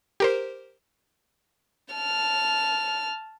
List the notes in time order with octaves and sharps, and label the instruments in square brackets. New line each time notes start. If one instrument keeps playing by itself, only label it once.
[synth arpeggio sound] G4 A#4 C5
[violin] A5 F6